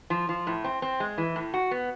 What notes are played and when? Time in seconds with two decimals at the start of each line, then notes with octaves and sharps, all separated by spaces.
0.10 F3
0.29 F3
0.47 A2
0.64 C4
0.82 C4
1.00 G#3
1.18 E3
1.36 A2
1.54 F#4
1.71 B3